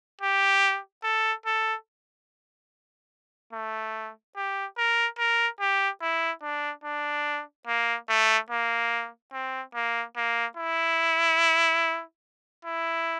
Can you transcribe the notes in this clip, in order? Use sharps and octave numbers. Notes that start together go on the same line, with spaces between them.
G4
A4
A4
A3
G4
A#4
A#4
G4
E4
D4
D4
A#3
A3
A#3
C4
A#3
A#3
E4
E4